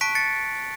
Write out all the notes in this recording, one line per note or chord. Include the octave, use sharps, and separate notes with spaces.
A5 C#6 F#6 B6 D7
A6 C#7